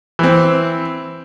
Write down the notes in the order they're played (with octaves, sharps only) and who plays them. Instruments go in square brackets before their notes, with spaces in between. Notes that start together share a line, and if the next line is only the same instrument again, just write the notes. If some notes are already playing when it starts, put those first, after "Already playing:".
[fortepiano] E3 C4